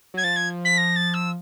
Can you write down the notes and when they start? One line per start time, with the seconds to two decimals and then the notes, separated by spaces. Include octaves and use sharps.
0.14 F#3 G#6
0.24 F3 A6
0.36 G#6
0.65 B6
0.78 A#6
0.96 A6
1.14 E6